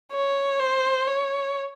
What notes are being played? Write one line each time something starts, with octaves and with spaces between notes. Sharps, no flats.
C#5
C5
C#5